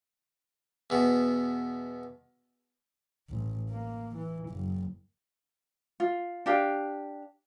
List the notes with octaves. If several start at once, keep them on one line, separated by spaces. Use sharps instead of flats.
E2 B2
A1
A#3
E3
F#1
F4
D4 G4 F5